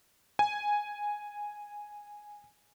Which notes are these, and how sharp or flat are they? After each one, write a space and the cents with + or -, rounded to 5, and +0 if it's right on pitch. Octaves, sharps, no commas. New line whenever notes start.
G#5 -5